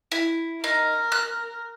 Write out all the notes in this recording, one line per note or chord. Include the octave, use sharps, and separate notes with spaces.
E4
D#4 A#4
F#6